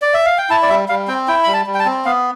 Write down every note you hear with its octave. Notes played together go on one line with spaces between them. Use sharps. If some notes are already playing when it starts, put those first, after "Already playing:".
D5
E5
F5
G5
E4 A5
D5
G3 E5
G3 F5
C4 G5
E4 G5
G3 B5
A5
G3
G5
A5
C4
B3 F5